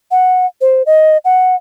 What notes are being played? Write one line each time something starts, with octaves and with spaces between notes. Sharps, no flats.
F#5
C5
D#5
F#5